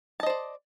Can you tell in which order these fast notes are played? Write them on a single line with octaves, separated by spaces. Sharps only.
A5 D#5 C5 D5